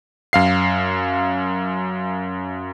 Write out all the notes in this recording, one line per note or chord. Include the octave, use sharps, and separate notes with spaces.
F#2 F5 C7